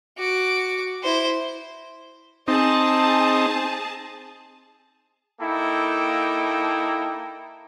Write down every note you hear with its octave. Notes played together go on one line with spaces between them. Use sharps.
F#4 D6
E4 C5
C4 D#4 G#4 A5
A#3 D#4 E4 A4 G5